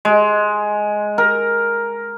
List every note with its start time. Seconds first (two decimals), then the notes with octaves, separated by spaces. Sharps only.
0.05 G#3
1.18 A#4